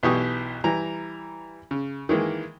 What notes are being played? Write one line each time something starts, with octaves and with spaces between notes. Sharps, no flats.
B1 B2 E3 G4 C#6 D#6
E3 G3 A#5
C#3
D#3 E3 G#3 A#3